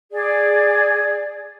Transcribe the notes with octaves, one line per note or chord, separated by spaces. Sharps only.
G#4 D5